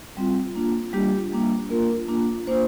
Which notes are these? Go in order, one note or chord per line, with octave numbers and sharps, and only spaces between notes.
G3 C4 F4
A#3 D4 F4
G3 A#3 D4 F4 G4
G3 A#3 D4
A#3 F4 A#4
A#3 D4 F4
A#3 D4 F4 C5